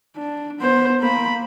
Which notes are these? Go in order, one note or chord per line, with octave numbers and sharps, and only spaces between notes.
D4
B3 C5
A#3 B5